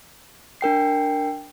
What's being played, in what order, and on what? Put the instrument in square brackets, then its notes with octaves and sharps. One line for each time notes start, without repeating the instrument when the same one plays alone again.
[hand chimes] D4 A#4 G5 C7